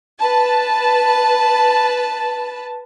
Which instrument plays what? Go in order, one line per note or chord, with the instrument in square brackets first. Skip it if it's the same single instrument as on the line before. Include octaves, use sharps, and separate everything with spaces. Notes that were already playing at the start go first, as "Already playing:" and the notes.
[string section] B4 A5